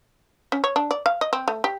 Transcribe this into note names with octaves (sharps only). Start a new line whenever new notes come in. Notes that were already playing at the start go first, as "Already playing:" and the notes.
C#4
C#5
D4
D5
F5
D#5
C4
A3
G4